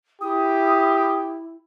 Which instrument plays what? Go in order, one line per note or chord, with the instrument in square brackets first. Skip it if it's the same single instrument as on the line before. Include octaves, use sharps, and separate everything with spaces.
[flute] E4 [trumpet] G4 [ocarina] D#6